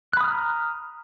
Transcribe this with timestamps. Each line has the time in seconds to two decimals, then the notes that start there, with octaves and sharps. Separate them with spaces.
0.13 F#6
0.17 B5
0.21 D#6
0.24 F6
0.28 A#5